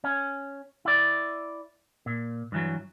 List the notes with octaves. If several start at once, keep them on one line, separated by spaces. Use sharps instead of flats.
C#4
E4 D5
A#2
G2 E3 F#3